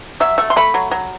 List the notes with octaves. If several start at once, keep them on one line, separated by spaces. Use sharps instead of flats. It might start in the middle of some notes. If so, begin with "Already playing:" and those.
F#3 E5
A3 E5
C6
A3 B5
F#3
F#3